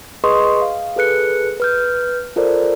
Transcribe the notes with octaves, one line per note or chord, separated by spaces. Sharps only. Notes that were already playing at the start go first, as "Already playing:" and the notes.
G#4 B4 D#5 C6 C#6 D#6
F5
G#4 A4 B4 F#6 C#7
B4 F6 G6
F4 A4 A#4 C5 D5